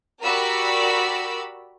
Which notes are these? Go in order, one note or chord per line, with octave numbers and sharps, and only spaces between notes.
F#4 G4 A#4 D5 B5 E6